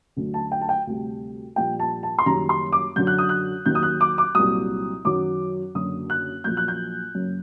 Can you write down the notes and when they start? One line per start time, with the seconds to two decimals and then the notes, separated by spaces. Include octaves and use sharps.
0.16 D2 D3 F#3
0.34 A5
0.52 G5
0.61 A5
0.69 G5
0.87 D2 C3 G3
1.56 A#1 A#2 G3 G5
1.80 A5
2.03 A5
2.19 C6
2.26 F#1 F#2 D#3 G3 A#5
2.49 C6
2.72 D6
2.96 F#2 D3 F#3 G6
3.07 F#6
3.18 D#6
3.29 F#6
3.65 D#2 D#3 F#3 G6
3.75 D#6
3.83 F#6
4.01 D6
4.18 D6
4.35 C2 A#2 F#3 D#6
5.05 F#2 D#3 F#3 D6
5.75 F#1 F#2 D3 F#3 D#6
6.10 F#6
6.44 A#1 A#2 F#3 G6
6.57 F#6
6.68 G6
7.15 F#1 F#2 F#3